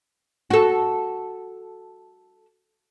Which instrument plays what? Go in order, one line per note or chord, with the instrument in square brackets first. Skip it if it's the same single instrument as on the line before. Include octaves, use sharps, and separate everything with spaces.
[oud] F#4 A4